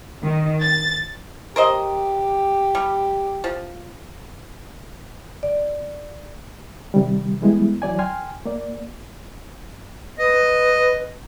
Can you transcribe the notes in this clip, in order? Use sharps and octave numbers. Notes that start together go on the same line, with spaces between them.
D#3
A6
G4 A#4 C5 D#5
G3
F3
D5
C3 D#3 G3
E3 G3 G#3 B3 E4
E3 F#3 D5 G#5
G5 G#5 C6 F6
A#3 D5
B4 D#5